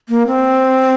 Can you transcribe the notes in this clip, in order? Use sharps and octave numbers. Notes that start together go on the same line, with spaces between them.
A#3
C4